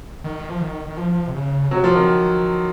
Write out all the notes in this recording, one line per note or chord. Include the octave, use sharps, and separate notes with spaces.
D#3
F3
D#3
D#3
F3
C3
C#3
C3 F#3
F3
D#3